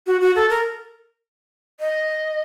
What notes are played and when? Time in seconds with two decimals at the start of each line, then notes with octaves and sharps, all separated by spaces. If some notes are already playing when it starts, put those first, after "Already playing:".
0.07 F#4
0.21 F#4
0.36 A4
0.50 A#4
1.80 D#5